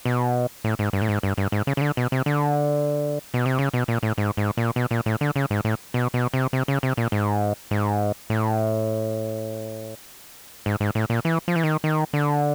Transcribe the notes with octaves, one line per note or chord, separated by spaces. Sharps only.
B2
A2
G#2
G2
A2
G#2
G2
G2
G#2
C#3
C#3
D3
B2
C3
D3
B2
C3
C#3
B2
A#2
A2
G#2
G#2
A#2
B2
A#2
A2
D3
C#3
G#2
A2
B2
B2
C3
C3
C#3
C3
A#2
G#2
G#2
A2
G#2
G#2
A2
A#2
E3
F3
E3
D#3
D#3
D3